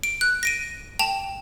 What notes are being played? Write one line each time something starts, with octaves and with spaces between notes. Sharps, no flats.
D7
F#6
A#6 D7 D#7
G5 A5 E7 F7